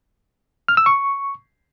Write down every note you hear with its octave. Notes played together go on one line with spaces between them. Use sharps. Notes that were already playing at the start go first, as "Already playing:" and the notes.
F6
E6
C#6